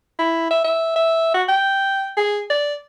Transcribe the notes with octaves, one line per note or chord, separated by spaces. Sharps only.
E4
E5
E5
E5
F#4
G5
G#4
D5